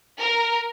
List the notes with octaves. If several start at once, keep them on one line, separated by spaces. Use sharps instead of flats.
A#4